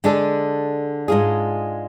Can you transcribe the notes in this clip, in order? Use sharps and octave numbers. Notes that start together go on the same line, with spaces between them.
D3 G#3 D4 A4
G#2 G#3 D4 F4 G#4